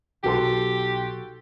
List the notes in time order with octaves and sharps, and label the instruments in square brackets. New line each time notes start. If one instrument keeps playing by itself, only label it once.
[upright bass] B1 [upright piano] F#4 A4 C6 [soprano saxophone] G4